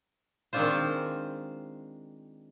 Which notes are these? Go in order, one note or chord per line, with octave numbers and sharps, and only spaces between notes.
D#3 G#3 C4 D4 F4 C5